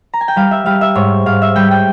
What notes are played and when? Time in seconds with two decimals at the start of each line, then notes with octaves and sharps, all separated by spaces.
0.14 A#5
0.21 G#5
0.28 G5
0.36 G3 F5
0.51 E5
0.66 G3 F5
0.81 E5
0.95 G#2 C#5
1.26 G#2 F5
1.42 E5
1.56 G3 G5
1.71 G5